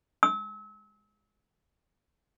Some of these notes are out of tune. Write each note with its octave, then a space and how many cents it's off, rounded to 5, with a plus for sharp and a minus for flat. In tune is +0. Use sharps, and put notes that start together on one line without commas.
E6 -35